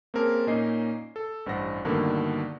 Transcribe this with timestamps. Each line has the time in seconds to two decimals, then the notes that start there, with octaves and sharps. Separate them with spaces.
0.14 A#3 C4 C#4 G#4 A#4 A5
0.47 A#2 A#3 C#4 D#4 D#5 C7
1.16 A4
1.46 A1 G2 C5 F#5 A#6
1.85 G2 B2 D3 D#3 A3 A#3